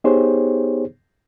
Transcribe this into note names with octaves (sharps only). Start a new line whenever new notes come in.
B3 D#4 G4 G#4 C5 C#5